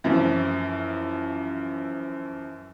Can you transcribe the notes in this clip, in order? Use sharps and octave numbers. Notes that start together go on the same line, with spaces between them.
F#2 E3 F3